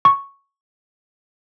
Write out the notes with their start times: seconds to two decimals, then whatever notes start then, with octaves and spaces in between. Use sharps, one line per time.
0.05 C#6